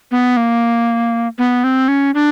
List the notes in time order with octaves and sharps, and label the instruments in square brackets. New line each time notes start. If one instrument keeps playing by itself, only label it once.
[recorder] B3
A#3
B3
C4
C#4
D4